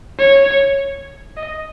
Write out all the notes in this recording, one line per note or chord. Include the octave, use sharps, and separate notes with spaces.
C#5
D#5